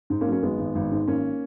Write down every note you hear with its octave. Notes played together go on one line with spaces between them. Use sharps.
G#2
A#3 C#4
F#3
A#3 C#4
G#1 G#3 B3
G#1
G#1
G#2
G#1 A#3 C#4